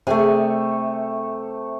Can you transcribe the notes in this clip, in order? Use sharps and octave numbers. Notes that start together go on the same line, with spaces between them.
C3 A3 G#4 D5 G#5